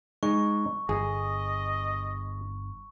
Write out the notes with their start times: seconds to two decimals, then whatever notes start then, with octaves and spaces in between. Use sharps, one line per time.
0.23 G#3 D#4 A#5 C#6
0.89 G1 G#4 D#5